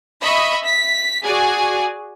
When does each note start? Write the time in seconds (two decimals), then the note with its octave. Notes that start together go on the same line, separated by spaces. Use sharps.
0.22 D#5 E5 B5 C#6
0.62 B6
1.23 F#4 G#4 D5 G#5